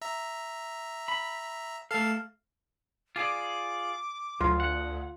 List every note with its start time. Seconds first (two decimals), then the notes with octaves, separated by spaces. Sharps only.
0.02 E5 A#5
1.08 B5
1.91 A3 A4 F5 A5
3.16 F4 G#4 D5 D6
4.41 D2 F#3 F4
4.60 F#5